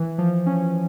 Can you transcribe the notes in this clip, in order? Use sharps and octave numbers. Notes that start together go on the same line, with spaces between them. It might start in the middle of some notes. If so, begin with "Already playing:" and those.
Already playing: E3
F3
C#4